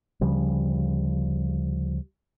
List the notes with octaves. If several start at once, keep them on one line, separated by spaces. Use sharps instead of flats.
D2 C#3 F3 G3